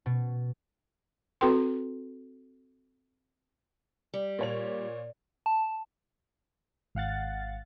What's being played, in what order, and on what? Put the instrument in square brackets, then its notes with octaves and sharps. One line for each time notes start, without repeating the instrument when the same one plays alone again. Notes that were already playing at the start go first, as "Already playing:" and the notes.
[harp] B2
[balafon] C4 F#4 A4 B4 G5 C6
[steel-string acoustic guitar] G3
[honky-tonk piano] A#2 C#5 F7
[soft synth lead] A5
[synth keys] G#1 F5 F#5 A6